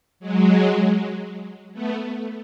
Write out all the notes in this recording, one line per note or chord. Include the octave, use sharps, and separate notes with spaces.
F#3 G#3
A3 B3